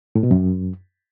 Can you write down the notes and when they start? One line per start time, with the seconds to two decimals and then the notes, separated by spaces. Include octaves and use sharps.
0.15 A2
0.23 B2
0.31 F#2